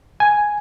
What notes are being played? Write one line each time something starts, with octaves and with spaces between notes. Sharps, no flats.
G#5